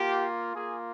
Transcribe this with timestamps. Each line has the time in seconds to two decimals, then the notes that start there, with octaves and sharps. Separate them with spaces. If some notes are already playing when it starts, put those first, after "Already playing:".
Already playing: A#3 F4 G4
0.54 A#3 F4 G#4